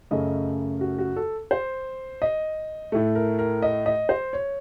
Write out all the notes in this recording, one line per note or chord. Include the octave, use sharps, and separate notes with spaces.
F#2 C#3 A3 D#5
F#4
F#4
A4
C5
D#5
A2 A3
A#4
A#4
D#5
D#5
C5
C#5